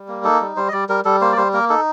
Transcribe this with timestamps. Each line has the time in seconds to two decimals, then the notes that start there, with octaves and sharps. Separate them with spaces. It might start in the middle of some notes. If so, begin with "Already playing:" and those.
Already playing: G3
0.08 A#3
0.24 D#4 A4
0.41 G3
0.56 G3 C5
0.68 D#5
0.73 G3 D5
0.89 G3 A#4
1.05 G3 A4
1.21 A#3 C5
1.32 D5
1.37 G3 C5
1.53 A#3 A#4
1.69 D#4 A4